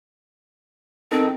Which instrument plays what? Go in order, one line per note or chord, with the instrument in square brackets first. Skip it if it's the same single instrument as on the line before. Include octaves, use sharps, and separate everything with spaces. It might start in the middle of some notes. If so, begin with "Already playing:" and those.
[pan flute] C4 [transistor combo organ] D#4 A4 A#4